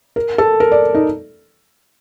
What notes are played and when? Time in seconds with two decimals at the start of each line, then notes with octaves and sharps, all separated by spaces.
0.16 A#4
0.38 A4
0.60 A#4
0.72 D5
0.95 D#4